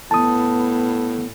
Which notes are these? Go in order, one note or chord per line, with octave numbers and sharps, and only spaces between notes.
A2 B3 A5 D#6